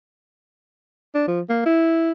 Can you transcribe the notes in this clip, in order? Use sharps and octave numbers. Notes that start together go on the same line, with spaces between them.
D4
F3
A#3
E4